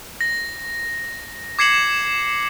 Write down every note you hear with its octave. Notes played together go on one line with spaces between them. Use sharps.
A#6
D6 G#6 C7 C#7 E7 F#7